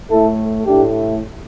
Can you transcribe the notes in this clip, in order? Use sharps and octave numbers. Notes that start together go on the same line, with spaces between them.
A2 A3 E4 A4
A2 A3 D4 G4